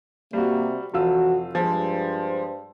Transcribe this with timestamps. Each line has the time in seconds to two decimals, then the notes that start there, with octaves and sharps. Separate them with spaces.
0.33 C3 G3 A#3 F#4
0.93 F1 E3 F4 F#4 E6
1.55 G2 F3 G#3 C5